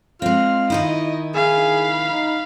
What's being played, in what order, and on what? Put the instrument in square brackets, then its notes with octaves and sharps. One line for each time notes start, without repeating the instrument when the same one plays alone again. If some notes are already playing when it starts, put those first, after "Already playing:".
[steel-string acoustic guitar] G#3 C4 [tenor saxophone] F4 [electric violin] F6
[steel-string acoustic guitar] D#3 D#4 E4 [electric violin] D#5
[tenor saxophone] G#4 [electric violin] F5 B5
[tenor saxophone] D#4